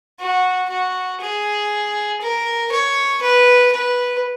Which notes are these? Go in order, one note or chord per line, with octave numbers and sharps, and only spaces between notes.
F#4
F#4
G#4
A#4
C#5
B4
B4